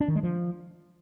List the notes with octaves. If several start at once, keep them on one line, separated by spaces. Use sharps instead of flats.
D4
D#3
G#3
F3